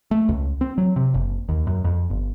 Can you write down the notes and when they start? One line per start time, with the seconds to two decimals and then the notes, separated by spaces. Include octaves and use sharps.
0.11 A3
0.29 C#2
0.61 C4
0.78 F#3
0.96 C3
1.14 F#1
1.49 D#2
1.67 F#2
1.85 F2
2.10 G1